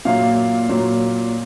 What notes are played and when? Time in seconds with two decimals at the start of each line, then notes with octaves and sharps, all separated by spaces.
0.05 A#2 F#3 A#3 F5
0.69 A#2 F#3 A#3